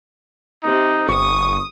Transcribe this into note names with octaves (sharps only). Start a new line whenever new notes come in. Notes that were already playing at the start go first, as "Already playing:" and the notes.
C3 D#4
G1 C#6 D#6